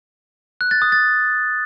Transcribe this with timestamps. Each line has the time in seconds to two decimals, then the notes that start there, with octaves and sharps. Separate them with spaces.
0.61 F#6
0.71 A6
0.82 D#6
0.92 A6